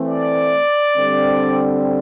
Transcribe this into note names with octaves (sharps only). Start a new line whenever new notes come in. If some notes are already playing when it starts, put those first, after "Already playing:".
Already playing: E3 A3 C4
D5
D3 G3 C4